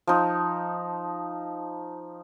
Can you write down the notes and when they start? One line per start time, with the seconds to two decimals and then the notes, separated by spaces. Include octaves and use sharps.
0.07 F3 D#4